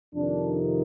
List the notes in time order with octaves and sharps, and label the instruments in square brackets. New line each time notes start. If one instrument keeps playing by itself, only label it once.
[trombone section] F2 C3 D#3 D4